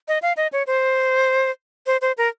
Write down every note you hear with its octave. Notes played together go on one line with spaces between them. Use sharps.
D#5
F5
D#5
C#5
C5
C5
C5
A#4